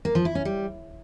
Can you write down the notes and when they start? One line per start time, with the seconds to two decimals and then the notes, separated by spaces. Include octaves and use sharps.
0.05 A#3
0.15 F3
0.25 E4
0.35 C#4
0.45 G3